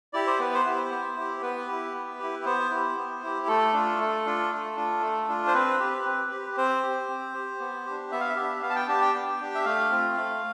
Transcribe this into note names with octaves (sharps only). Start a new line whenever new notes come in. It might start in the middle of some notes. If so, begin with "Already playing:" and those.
E4 G4 D5
C5
B3 B4
C5
E4 G4
B3
E4 G4
B3 B4
E4 G4
B3
E4 G4
B3 C5
E4 G4
B3
E4 G4
A3 A4
D4 F4
A3
D4 F4
A3
D4 F4
A3
D4 F4
C5
C4 B4
G4
C4
G4
C4 C5
G4
C4
G4
B3
D4 G4
B3 E5
F5
E5
D4 G4
B3 F5
A5
G5
D4 G4 A5
G5
B3
D4 G4
E5
A3 F5
C4 F4
A3